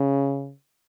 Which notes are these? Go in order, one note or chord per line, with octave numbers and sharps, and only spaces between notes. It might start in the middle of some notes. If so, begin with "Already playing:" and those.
Already playing: C#3